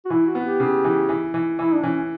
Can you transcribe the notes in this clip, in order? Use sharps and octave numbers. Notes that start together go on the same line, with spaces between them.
F#4
E3 E4
F#4
B3
G4
C#3
E3
E3
E3
E3 E4
D4
E3 C#4